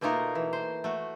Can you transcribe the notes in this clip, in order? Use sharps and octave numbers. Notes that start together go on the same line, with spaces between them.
B2 A3 A#3 D#4 F4 A#4
E3
C5
A3 F#4